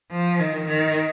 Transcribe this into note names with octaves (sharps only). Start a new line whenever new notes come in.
F3
D#3
D#3